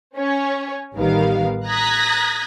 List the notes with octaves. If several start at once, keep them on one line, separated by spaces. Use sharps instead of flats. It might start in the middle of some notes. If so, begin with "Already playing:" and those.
C#4 C#5
A1 D#3 G3 B3 A#4 F5
A#5 D#6 F#6 G#6 A#6 B6